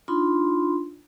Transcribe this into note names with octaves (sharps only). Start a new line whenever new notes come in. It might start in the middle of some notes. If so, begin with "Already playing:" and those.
D4 D#4 F4 B5 C6